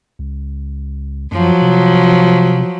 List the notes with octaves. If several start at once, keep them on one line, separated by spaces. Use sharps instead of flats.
C#2
F#2 F3 F#3
C3